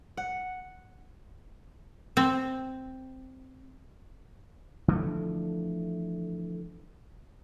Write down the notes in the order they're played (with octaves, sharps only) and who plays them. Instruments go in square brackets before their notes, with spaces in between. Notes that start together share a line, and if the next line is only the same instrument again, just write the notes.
[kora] F#5
[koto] C4
[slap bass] D3 E3 F3 A3